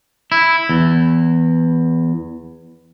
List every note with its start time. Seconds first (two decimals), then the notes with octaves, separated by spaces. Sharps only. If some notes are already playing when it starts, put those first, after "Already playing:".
0.32 E4
0.69 E2